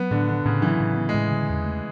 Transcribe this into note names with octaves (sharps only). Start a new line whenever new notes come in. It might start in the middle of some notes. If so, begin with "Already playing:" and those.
Already playing: F#3 B3
A2 D3
D3 B3
A2 C#3
E3 F#3
A2
B3
A2 G#3
D3
E2
A3